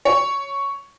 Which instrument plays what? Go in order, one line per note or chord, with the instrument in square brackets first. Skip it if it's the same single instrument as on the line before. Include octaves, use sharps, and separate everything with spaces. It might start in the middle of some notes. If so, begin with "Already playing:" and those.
[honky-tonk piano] C#5